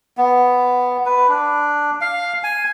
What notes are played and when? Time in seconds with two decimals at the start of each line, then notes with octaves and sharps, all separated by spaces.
0.17 B3
1.06 B4
1.29 D4
2.01 F5
2.43 G#5